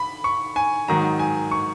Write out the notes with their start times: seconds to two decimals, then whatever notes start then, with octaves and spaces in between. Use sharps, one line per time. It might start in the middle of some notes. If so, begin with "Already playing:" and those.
Already playing: B5
0.24 C#6
0.56 G#5
0.88 G#2 D#3 F#3 A#5
1.19 G#5
1.51 C#6